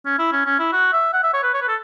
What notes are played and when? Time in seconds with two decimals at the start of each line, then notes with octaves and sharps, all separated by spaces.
0.06 C#4
0.19 E4
0.32 C#4
0.46 C#4
0.59 E4
0.73 F#4
0.93 E5
1.14 F#5
1.23 E5
1.34 C#5
1.43 B4
1.54 C#5
1.62 B4
1.69 A4